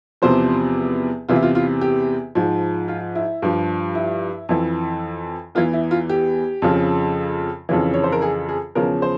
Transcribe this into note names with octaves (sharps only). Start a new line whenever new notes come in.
E2 C3 F3 C5
E2 C3 E3 F4
E4
F4
F4
G4
G#2 F3
F4
E4
G2 F3
E4
F2 E3
E2 E3 F4
E4
F4
G4
F2 C#3 F3
F2 C#3 E3
C#5
C5
A#4
G#4
G#4
E2 C#3 F3 A#4
C5